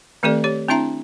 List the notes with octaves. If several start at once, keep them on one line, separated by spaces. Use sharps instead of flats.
D#3 A3 C4 G4 A4 D5
G4 C#5
C4 D4 E4 E5 A#5